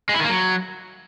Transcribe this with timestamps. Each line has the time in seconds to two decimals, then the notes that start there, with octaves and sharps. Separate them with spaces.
0.09 G#3
0.14 E4
0.19 D#3
0.24 A#3
0.29 F#3